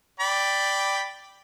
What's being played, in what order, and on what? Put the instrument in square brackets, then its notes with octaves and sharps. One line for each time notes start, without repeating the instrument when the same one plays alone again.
[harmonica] D5 G5 B5